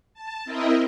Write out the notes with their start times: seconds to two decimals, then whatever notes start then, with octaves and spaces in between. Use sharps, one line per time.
0.14 A5
0.45 C4 E4 A#4 D#5 E5